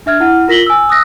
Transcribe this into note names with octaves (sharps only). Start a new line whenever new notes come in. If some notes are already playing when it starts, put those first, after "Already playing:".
D4 E5 F6 G#6
E4 F#5 F6
F4 A#4 A#6 B6 F#7 G7
G#5 E6
D#6 E6 F#6 A#6